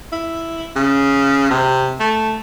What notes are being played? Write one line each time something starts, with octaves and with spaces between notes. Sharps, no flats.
E4
C#3
C3
A3